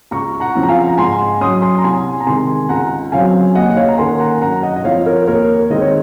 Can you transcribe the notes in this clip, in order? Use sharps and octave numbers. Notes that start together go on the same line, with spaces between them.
C#2 A#5 C#6
F#5 A#5
C#3 F3 C4
A#5
F5 G#5
A#5
G#2 G#5 C6
F#3 C#4 C6 D#6
G#5 C6
A#5
C2 G#5 C6
A#5
C3 D#3 G#3 G#5 C6
C#2 F#5 A#5
C#3 F#3 C4 F5 G#5
D#2 D#5 F#5
F#5
C#5 F5
A#5
D#3 A#3 C#4 G#5 C6
F#5 A#5
F#2 F#5 A#5
D#5 F#5
D#5
F3 C4 C#5 F5
A#4 C#5
D#2 A#4 C#5
D#3 G#3 C4 D#5
C#5